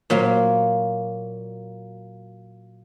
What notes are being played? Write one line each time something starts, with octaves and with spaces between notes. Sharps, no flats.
A#2 F#3 A#3